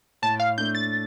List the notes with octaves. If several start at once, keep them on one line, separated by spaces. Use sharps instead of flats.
A2 A5
F5
A3 D4 G6
A6